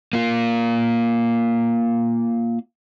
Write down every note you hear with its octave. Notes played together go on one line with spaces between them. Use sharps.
A#3 F4